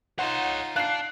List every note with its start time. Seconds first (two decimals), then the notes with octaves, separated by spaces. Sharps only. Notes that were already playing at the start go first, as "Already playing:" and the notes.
0.19 D#4 F4 C#5 F#5 C6
0.76 D5 F5 A5 F#6 C7